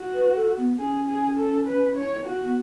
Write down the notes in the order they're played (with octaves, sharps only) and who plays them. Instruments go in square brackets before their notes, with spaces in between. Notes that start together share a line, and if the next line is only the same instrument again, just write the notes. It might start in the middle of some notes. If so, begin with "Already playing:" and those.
Already playing: [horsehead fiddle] F#4
[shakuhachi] B4
A4
B3
[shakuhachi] C#4 [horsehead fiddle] G#4
[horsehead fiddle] G#4
A4
B4
C#5
F#4
[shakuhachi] B3